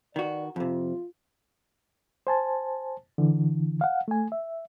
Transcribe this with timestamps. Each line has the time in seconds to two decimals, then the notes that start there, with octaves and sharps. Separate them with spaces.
0.16 D#3 F#4 B4 D5
0.56 F2 C3 F4
2.27 C5 G#5 A5
3.18 D3 E3
3.81 F5 F#5
4.08 A3 G#5
4.32 E5